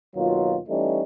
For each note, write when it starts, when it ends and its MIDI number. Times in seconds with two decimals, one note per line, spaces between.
0.16 0.58 39
0.16 0.58 47
0.16 0.58 54
0.16 0.58 65
0.69 1.01 52
0.69 1.01 55
0.69 1.01 57
0.69 1.01 61
0.69 1.01 63